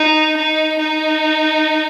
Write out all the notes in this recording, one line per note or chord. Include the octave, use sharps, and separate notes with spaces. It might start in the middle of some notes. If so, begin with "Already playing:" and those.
Already playing: D#4
D#4
D#4